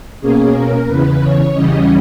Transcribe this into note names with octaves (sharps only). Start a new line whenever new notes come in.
B2 A#3 C#4 G#4
A#4
E2 C#3 E3 B4
C#5
E2 C#3 E3 G3 C#4 D#5